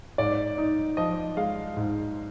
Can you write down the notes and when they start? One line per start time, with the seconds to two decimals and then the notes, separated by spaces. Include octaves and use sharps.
0.18 G#2 D5
0.58 D#4
0.97 F3 D#5
1.37 G#3 F5
1.77 G#2